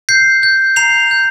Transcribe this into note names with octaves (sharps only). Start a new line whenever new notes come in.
G6 C7
G6
A#5 C7 F7
G6